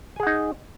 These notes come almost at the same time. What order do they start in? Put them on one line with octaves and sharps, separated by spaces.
G#5 G#4 F#5 D#4